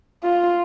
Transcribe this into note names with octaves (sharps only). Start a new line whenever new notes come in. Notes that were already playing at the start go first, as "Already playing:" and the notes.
F4